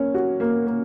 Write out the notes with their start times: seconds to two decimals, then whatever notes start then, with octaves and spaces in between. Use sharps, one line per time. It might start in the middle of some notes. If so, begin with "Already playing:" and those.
Already playing: A#3 C#4
0.14 F#4
0.40 A#3
0.67 A#3